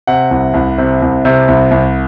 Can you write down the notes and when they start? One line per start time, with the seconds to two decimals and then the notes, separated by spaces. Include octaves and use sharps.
0.07 C3 F#5
0.31 C2
0.54 C2
0.78 C3
1.02 C2
1.25 C3
1.48 C2
1.71 C2